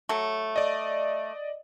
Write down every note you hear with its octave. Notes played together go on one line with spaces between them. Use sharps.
F#3 A3
D5 D#5